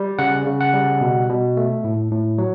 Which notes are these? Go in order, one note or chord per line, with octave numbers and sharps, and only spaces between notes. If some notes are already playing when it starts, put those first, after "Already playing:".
Already playing: G3
C#3 F#5
C#3
F#5
G3
B2
B2
A3
A2
A2
F#3